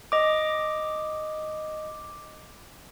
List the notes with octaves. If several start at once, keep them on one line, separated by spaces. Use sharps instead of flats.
D#5 D6